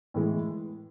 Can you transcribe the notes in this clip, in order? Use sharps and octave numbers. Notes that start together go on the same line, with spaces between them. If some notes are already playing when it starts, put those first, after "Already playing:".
A2 E3 G#3